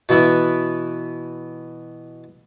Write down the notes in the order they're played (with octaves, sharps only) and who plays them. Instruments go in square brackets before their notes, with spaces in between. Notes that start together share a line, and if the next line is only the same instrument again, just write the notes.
[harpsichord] B2 E3 B3 E4